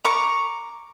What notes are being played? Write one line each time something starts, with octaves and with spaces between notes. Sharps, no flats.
A#5 C#6 D6